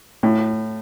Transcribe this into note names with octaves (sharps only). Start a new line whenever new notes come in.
A2